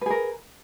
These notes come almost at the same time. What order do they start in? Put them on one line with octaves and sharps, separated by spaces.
B4 G#4 A#4